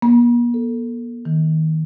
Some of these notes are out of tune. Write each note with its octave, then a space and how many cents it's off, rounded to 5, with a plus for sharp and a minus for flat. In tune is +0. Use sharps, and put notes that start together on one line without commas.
A#3 +45
A4 +15
D#3 +25